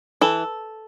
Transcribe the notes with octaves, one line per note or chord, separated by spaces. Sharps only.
E3 A4